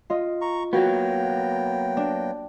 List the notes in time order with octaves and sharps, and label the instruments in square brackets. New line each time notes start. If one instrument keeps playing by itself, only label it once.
[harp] F4 D#5
[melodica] A#5 C#6
[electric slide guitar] F#3 A#3 B3 [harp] F#4 [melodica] G5
[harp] D4